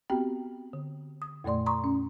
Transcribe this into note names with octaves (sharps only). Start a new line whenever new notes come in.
B3 C4 F#4 G4 G5
D3
D#6
F2 A#2 A3 D5 C6
A#5 C6 C#6 D#6
C#4